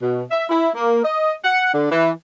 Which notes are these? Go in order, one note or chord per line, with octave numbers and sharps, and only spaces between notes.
B2
E5
E4
A#3
D#5
F#5
D3
E3